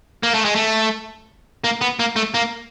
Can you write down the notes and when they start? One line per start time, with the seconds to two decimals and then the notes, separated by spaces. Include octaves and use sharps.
0.23 A#3
0.34 A3
0.45 G#3
0.55 A3
1.64 A#3
1.81 B3
1.99 A#3
2.16 A3
2.34 A#3